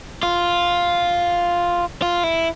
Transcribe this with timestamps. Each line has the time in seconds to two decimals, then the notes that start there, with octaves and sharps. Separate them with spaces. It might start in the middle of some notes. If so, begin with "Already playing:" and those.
0.23 F4
2.02 F4
2.24 E4